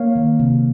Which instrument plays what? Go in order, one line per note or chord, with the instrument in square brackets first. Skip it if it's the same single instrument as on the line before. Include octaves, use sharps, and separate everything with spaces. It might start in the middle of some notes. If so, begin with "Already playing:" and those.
Already playing: [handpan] A#3 C#5 F5
D#3
C3